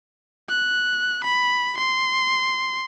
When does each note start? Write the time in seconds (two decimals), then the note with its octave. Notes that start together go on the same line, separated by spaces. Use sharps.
0.49 F#6
1.25 B5
1.78 C6